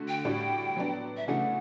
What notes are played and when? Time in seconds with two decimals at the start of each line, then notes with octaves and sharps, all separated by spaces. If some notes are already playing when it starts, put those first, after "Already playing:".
Already playing: D3 A3 F#4
0.08 G5
0.25 A2 G3 D4 F#4
0.77 F#3 B3 D4
1.17 E5
1.28 C#3 E3 A3 D4 F#4 F#5